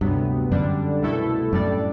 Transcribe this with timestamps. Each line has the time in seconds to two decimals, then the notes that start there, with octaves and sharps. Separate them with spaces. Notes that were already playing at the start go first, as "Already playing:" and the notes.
0.01 D2 G2 C3 F#3 B3
0.52 F#2 D3 G3 D4
1.02 C2 B2 A3 E4 A4
1.53 F#2 A2 G3 D4 A4 D5